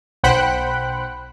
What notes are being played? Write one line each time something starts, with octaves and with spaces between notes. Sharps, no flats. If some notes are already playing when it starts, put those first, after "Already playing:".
B1 C5 F#5 G5 B5 F#6